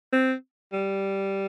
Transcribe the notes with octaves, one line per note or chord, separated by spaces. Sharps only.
C4
G3